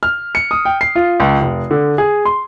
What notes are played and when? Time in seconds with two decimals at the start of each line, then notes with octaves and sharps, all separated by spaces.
0.03 F6
0.35 C#7
0.51 D#6
0.65 G5
0.81 C7
0.95 F4
1.20 C#2
1.41 F1
1.71 D3
1.98 G#4
2.25 C6